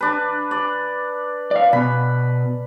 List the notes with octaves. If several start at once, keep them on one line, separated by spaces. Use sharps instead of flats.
D4 B4
D5
D5 F5
B2 B3 B5